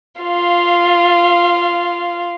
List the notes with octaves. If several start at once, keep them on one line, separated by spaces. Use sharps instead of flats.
F4 F5